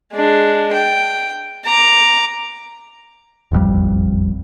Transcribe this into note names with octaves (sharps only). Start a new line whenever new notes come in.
G#3 D4
G5
A#5 D6
E1 A1 F2 G3